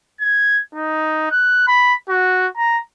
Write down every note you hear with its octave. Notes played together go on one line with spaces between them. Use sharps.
G#6
D#4
F#6
B5
F#4
A#5